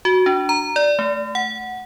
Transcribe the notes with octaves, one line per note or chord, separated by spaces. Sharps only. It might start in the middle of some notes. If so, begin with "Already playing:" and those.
F#4
D4
A#5
D5
A3
F#5